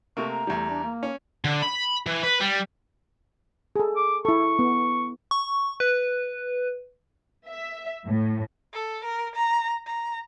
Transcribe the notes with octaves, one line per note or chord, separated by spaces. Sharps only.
C3 A3 A#3 C#6
A#5
E2 G3 A3
D4
A#3
C#4
D3
B5
E3
B4
G3
G#4 A4
D6
E4 A4 C#6
B3
C#6
B4
E5
A2
A4
A#4
A#5
A#5